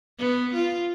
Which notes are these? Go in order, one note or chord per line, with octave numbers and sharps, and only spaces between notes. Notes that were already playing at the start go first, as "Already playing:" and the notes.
B3
F4